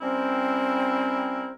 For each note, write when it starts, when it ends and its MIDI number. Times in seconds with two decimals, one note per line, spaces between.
0.01 1.52 55
0.01 1.52 60
0.01 1.52 61
0.01 1.52 64
0.01 1.52 70
0.01 1.52 72